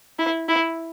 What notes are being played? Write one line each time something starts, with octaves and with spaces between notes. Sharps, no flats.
E4
E4